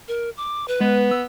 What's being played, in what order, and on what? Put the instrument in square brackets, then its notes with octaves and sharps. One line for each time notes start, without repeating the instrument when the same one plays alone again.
[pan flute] A#4
D6
B4
[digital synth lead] G#3 [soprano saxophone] B3
[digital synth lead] E6